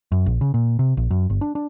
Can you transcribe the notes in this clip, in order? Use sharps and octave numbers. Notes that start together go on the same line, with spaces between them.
F#2
A#1
C#3
A#2
C3
A#1
F#2
G1
D4
D4